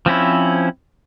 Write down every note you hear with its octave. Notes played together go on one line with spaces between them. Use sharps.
F3 C4 C#4 E4